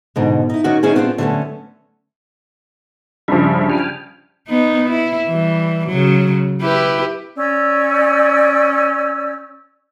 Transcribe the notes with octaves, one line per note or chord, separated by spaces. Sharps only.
G#2 B2 D3
D#4 E4
D#3 A#3 C#4 F#4
D#3 A#3 C#4 E4 G#4
B3 C4 D4 D#4 F4
D3 F#3 G3 A3 B3 C#4
G2 C#3 F3 G3 E5
G5 G#5 F6
B3 D#4
E4
E3 G3
C#3 F#3
E4 G4 B4
C#4 D5 E6 G6